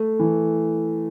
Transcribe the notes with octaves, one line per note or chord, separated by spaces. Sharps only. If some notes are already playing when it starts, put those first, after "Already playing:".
Already playing: A3
E3